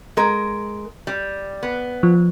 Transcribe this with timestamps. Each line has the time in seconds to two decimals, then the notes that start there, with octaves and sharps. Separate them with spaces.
0.17 G#3 A#4
1.07 G3
1.63 B3
2.03 F3